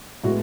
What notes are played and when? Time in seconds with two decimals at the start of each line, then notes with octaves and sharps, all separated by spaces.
0.24 A2 G#3 B3 F#4